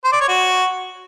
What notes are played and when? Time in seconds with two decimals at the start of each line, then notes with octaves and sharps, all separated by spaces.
0.04 C5
0.12 D5
0.21 C#5
0.29 F#4